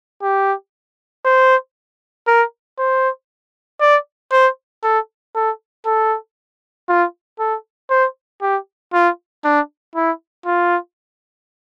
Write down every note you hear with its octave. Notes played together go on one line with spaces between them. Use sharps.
G4
C5
A#4
C5
D5
C5
A4
A4
A4
F4
A4
C5
G4
F4
D4
E4
F4